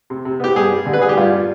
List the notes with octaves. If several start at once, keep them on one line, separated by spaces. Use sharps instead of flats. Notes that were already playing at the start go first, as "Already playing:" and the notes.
C3
C3
B3 G4
G2 G#4
G3
D3
B4
G3 G#4
G4
G2 F4
G3